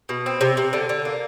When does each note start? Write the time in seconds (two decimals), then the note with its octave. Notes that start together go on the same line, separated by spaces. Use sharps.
0.09 B2
0.26 C4
0.41 C3
0.57 C3
0.73 D3
0.89 D3
1.05 A#3